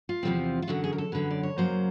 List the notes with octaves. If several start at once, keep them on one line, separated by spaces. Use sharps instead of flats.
F4
E2 C3 F3 G#3 C4
F4
F#2 D3 F#3 F#4
G#4
A#4
A4
F#2 D3 F#3 B4
D5
C#5
F#2 C#3 F#3 A#3 C5